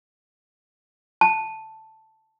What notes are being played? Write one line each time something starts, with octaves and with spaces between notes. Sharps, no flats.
A5